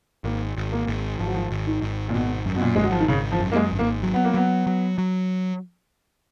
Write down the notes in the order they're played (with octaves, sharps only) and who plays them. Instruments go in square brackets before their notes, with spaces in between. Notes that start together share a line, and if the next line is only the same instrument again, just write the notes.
[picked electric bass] G#1 [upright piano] A#3
[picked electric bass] G#1
[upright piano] A#3
[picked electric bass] G#1
[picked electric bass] G#1 [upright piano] F3
[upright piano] F#3
F3
[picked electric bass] G#1
[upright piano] D#3
[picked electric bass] G#1
[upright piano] A#2
[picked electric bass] G#1 [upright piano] B2
[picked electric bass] F#2
[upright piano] B2
A#2
[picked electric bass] G#1 [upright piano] G#3
[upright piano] F#3
F3
D#3
[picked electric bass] G#1 [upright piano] C#3
[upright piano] F3
[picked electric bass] F#2
[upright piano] A#3
G#3
[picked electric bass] G#1
[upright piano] A#3
[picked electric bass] F#3
[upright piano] B3
A#3
[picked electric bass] F#3 [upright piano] B3
[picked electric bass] F#3
F#3